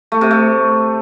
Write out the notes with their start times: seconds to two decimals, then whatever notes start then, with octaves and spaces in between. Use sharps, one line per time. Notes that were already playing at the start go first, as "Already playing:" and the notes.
0.12 A3
0.21 C3
0.31 A3